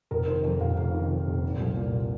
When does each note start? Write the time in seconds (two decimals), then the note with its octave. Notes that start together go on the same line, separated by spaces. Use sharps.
0.11 F1 A#4
0.27 D#3 C5
0.44 F2 C5
0.61 F1 F5
0.77 F1 F5
0.94 D#3
1.10 F2
1.27 F1
1.43 A#2
1.60 C2
1.76 A#2